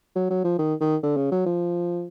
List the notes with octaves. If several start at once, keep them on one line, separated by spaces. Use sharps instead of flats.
F#3
F#3
F3
D#3
D#3
D3
C#3
F#3
F3